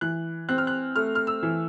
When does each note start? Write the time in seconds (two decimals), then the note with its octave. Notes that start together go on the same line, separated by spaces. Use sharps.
0.01 E3 F#6
0.49 C4 F#6
0.58 F6
0.67 F#6
0.96 A3 F6
1.15 F6
1.27 E6
1.43 E3